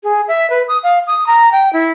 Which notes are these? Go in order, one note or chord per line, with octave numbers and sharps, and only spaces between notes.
G#4
E5
B4
D#6
F5
D#6
A#5
G5
E4